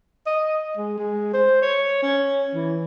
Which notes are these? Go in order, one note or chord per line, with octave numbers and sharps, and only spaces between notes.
D#5
G#3
G#3
C5
C#5
C#4
E3